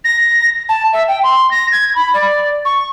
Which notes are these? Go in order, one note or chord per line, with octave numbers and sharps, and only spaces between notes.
A#6
A5
E5
G5
C6
A#6
G#6
B5
D5
C#6